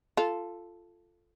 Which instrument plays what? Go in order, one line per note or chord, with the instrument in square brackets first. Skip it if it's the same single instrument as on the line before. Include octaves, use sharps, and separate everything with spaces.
[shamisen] F4 A4